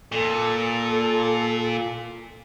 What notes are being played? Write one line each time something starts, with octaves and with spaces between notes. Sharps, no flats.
A#2 A4